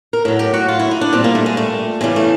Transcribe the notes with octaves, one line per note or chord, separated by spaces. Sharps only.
A#4
A2 F#3 A4
G4
F#4
F4
E4
D#4
D4
A#2 G3 C4
A#3
A3
G#3
A3
E2 C#3 E3 G3 G#3
A3